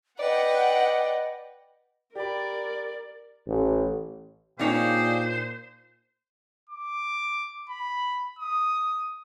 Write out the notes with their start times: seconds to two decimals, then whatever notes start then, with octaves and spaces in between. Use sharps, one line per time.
0.20 B4 D5 D#5 F#5 G5
2.15 G4 A#4 D5 B5
3.47 A1
4.59 A#2 D4 D#4 G4 G#4 C5 C#5 F5
6.69 D6
7.70 B5
8.39 D#6